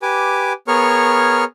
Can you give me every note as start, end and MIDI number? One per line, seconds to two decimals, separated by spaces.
0.02 0.53 67
0.02 0.53 71
0.02 0.53 80
0.02 0.53 86
0.68 1.44 59
0.68 1.44 68
0.68 1.44 70
0.68 1.44 73
0.68 1.44 85
0.68 1.44 89